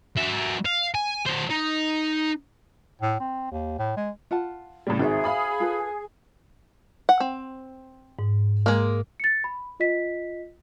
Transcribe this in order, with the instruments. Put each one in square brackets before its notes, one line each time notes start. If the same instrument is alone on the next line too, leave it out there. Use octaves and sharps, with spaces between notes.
[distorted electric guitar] F#3 E5
F5
G#5
F#3 C5
D#4
[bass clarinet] A2
C4
D#2
A2
G#3
[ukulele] F4 F#5 A5
[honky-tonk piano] A2 C#3 G3
[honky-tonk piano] G#1 [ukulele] F#4 C5 E5 [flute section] G#4
[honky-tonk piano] F5 B5 D#6
[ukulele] F4 A4 B4
[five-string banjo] F#5
C4
[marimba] G#2
[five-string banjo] G#3 A#3
[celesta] A6 C#7
B5
F4 D#5 B6